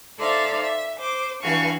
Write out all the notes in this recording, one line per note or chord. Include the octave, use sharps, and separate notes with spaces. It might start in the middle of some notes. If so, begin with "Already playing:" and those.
D#4 A4 C5 D5 E5 F5
E5
C5 D6
G2 E3 F#4 F5 G#5 C#6